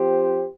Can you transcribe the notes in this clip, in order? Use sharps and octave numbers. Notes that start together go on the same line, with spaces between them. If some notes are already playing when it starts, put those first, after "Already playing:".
Already playing: F3 C4 G4 C5